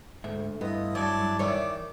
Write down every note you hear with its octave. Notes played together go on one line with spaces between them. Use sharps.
D2 G#2 E5
G2 B3 E4 F4 D#5
F#3 D5 G#5 A5
D#3 E3 C#5 D5 D6